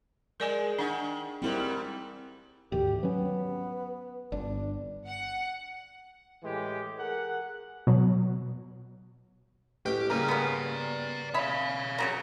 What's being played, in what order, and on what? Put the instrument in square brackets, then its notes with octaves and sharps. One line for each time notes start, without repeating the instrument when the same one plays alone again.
[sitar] G#3 [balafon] A#4 D5 G#5
[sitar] D#3 [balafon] D4 F#5
[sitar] G#2 G3 [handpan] C4 E4 A#4
[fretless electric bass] D2 G#2 D#3 [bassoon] G4
[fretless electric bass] F#3 C#4 [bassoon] B3
[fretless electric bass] G1 [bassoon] D4
[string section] F#5
[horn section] A2 E3 G#3 G4
G#4 A#4 F#5
[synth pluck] B2 F#3
[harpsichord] A1 F#4 G5 [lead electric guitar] G4
[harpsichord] C#3 G3 A#3 [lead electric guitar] D5 A#5
[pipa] B3 C#4
[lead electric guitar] C#5 F5 [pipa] E5 B5
[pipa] C#3 F#3 A#5